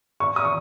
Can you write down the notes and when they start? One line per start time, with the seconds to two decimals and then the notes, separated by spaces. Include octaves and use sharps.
0.20 C#6
0.36 D#6
0.45 C#6